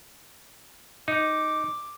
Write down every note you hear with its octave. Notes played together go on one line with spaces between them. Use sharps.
D#4 D6